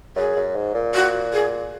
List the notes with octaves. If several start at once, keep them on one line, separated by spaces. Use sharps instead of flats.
F#2 G#4
F#2
G#2
A#2
F#4
G#4